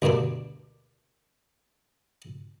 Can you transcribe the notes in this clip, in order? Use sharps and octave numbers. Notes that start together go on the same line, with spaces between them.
D2 G2 B2 A#3 D4